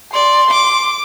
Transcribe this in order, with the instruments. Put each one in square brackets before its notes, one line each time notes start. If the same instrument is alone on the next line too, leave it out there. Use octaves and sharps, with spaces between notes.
[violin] D5 [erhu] C6
[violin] D6